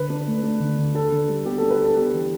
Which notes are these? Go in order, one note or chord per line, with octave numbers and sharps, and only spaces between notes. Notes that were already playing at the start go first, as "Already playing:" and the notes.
Already playing: D3 B4
D4
A3
D4
D3
D3
D4 A4
D3
G3
B3 G4
A4
D4
B4
B3 A4
B3 G4
E3